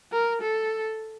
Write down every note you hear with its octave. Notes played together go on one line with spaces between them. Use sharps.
A#4
A4